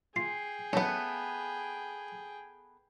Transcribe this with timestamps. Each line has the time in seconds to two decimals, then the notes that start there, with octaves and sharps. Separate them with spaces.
0.16 F4 G#4 G5 C7
0.73 F#3 A3 B3 C#4